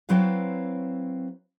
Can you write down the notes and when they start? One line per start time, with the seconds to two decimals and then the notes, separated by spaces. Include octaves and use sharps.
0.09 F#3 C4 E4 B4 C5 F5